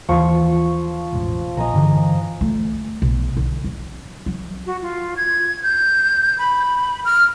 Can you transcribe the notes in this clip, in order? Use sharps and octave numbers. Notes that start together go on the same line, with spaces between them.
D#2 E3 F3 C#6
E1 A1
A#1 D#5 G#5 A#5
G2 D3 E3
A3
B1
D3
F#3
F#3
F#4
F4
G#6
G6
B5
F6